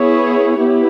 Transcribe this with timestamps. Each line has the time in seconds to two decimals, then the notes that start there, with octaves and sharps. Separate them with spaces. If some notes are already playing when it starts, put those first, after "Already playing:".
Already playing: B3 E4 G#4 C#5
0.57 B3 E4 G4